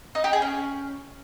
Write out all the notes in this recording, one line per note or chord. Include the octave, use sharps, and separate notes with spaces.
D#4
G4
G#4
C#4